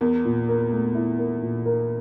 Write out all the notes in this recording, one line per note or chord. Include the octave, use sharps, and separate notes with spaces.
E2 A#4
A#2
A#4
A3
E4
A#4
A#2
A#4